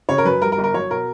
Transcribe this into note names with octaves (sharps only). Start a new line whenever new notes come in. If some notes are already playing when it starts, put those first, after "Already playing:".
C#3 C#5
A#4
F#2 B4
G3 A#4
A#4
G1
A#4
F#3 C#5
B2 A#4